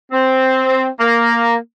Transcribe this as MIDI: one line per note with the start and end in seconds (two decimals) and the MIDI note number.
0.12 0.86 60
1.00 1.55 58